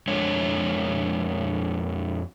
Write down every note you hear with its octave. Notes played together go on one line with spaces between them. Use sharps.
F2 G#3 D4 C#5